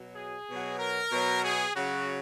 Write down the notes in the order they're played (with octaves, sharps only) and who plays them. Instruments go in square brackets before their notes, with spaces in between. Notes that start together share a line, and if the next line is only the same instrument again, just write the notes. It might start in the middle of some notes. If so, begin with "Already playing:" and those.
Already playing: [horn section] B2 F#3
G#4
B2 F#3
A#4
B2 F#3
G#4
C#3 F#3 F#4